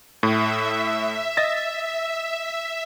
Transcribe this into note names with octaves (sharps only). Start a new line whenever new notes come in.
A2 E5
D#5 A6 A#6